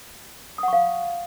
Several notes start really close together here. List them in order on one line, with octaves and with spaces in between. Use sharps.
D#6 F#5 C#6 F5